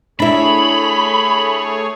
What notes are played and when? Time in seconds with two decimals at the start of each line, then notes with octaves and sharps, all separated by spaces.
0.20 A3 D4 E4 G#4 C#5 B5